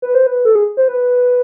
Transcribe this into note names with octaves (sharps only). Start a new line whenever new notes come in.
B4
C5
B4
A4
G#4
C5
B4